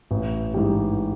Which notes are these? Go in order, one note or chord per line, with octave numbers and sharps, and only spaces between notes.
A1
G#2 E3 G3